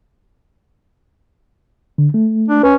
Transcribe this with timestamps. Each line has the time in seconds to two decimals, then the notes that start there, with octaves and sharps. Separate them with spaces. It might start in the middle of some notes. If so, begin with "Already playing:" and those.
1.98 D3
2.14 A3
2.48 D4
2.63 C#4 B4